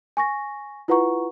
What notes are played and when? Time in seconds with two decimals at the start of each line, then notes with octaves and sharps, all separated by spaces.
0.17 G#5 C#6 A#6
0.88 E4 F4 B4 F#5 A#5 C#6